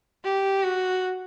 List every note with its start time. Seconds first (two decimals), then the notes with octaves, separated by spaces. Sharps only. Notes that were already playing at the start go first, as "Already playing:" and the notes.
0.24 G4
0.63 F#4